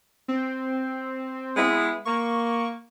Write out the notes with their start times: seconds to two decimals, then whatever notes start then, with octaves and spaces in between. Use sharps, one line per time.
0.28 C4
1.56 G#3 B3 E4
2.05 A#3 C#6